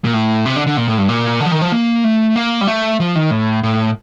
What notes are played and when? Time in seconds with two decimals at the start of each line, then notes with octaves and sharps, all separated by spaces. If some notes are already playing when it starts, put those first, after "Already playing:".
0.04 A#2
0.14 A2
0.46 C3
0.56 D3
0.67 D3
0.77 A#2
0.88 A2
0.98 G2
1.09 A#2
1.40 D3
1.46 F3
1.51 D#3
1.61 F3
1.72 A#3
2.04 A3
2.36 A#3
2.61 G3
2.68 A3
3.00 F3
3.16 D#3
3.31 A2
3.63 A2